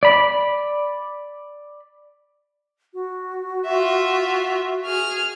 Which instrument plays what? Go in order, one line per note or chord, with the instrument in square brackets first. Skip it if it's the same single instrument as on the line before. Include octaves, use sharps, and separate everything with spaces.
[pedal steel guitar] D5 B5
[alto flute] F#4
[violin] F4 E5
G#4 F6